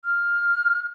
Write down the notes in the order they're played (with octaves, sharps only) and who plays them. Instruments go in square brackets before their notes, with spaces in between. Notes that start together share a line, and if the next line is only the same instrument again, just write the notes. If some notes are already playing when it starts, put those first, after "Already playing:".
[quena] F6